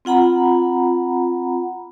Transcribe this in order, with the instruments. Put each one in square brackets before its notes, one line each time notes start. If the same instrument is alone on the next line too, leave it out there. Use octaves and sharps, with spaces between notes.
[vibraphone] C4 F4 F#5 A#5 B5